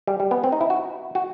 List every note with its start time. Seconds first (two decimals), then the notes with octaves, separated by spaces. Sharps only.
0.07 G3
0.20 G3
0.31 B3
0.44 C4
0.52 D#4
0.61 E4
0.70 F#4
1.15 F#4